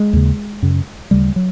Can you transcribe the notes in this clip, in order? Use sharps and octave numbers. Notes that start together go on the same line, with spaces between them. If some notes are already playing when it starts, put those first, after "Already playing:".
Already playing: G#3
D#2 C#3
F#2 C#3
D2 C#3 G3
F#3